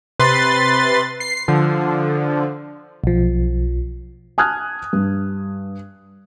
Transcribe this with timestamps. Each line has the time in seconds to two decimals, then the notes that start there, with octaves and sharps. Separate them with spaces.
0.19 C3 B4 C6 A6
1.20 C7
1.48 D3 F3
3.04 B1 F3
4.38 G#5 A5 D#6 F6 F#6 G#6
4.93 G2